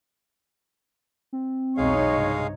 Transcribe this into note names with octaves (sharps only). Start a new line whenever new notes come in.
C4
B1 E2 G#3 D#4 G#4 C#5 F5
G2 C3 D#5